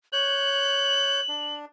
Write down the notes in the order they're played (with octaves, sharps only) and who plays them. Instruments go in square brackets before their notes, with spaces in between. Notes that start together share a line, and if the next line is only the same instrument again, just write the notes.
[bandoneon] C#5 F#6 G6 [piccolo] F#7
[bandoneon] D4